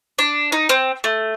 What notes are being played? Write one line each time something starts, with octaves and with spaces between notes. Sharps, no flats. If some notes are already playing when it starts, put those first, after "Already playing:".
D4
D#4
C4
A3